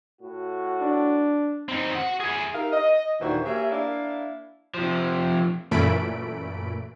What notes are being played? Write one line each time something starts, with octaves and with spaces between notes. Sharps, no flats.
A2 F#4
D4
C4 D#4
F#4 F#5
E4 G#4
D#4 G4 A#4 E5 F5
D#5
D#2 A#2 E3 D4 F#4 C5
A#3 G4 G#4 C#5 E5
A#3 D4 E4 E5 F5
C3 F3
F#2 A#2 E3 A3 B5 D7